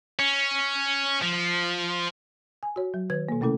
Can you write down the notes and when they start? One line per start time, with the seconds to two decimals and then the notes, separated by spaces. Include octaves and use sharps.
0.19 C#4
1.22 F3
2.63 G#5
2.76 F#4 C#5
2.94 F#3
3.10 D#3 B4 G#6
3.29 B2 A#3
3.41 C3 A3 C#4 E4 A4